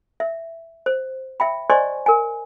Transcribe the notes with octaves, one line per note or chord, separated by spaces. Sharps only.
E5
C5
E5 G5 B5
C5 D5 D#5 G#5 C6 C#6
A#4 G#5